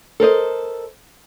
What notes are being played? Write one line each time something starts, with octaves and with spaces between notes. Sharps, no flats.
A4 A#4 C5 D#5